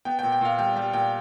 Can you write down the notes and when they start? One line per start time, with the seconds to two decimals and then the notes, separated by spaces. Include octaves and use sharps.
0.05 B3 G5
0.19 A#2 G5
0.32 G5
0.41 A#2 F5
0.58 G3 G5
0.76 G3 G5
0.93 A#2 G5